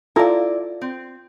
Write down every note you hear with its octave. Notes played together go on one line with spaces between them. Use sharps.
E4 F4 A4 D5 A#5
C4